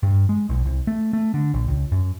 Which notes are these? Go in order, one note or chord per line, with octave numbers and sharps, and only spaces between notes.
G2
G#3
B1
C2
A3
A3
D3
A#1
C#2
F#2